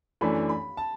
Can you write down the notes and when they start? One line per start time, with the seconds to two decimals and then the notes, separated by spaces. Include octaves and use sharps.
0.21 F#2 E3 A3 D4 B5
0.49 B5
0.77 A5